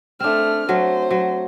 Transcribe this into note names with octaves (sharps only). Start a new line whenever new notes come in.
A3 C4 D4 F6
F#3 A3 C5
F#3